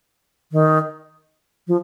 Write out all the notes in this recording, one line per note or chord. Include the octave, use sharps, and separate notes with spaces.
D#3
F3